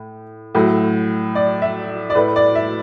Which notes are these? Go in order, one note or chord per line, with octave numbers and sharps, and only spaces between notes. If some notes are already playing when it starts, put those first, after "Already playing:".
Already playing: A2
A2 F#3 A3
D5
E5
D5
A2 A3 B4
D5
E5